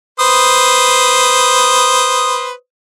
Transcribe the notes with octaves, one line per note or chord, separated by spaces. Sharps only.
B4 C5 D#6